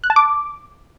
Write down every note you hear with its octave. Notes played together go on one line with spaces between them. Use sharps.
F#6
A5
D6